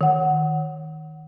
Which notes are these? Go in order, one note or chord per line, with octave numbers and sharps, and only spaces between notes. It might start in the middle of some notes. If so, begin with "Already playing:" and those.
D#3 F#5